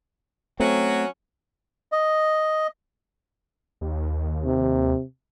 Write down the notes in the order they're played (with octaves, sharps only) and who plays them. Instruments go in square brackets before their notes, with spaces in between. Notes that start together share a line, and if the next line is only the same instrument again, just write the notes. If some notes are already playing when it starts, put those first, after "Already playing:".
[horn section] F#3 C#4 F#4 [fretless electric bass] A3 C4
[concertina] D#5
[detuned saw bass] D#2
[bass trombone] C3